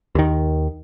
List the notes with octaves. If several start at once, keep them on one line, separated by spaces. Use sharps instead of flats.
D#2 D#3